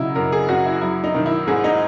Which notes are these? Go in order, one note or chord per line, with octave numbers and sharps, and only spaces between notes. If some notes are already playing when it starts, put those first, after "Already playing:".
Already playing: C#3 F#3 D#4 E4
F#2 A#4
G#4
F#2 F#4
E4
F#3 E4
D#4
D#3
E4
G#2 G#4
D#4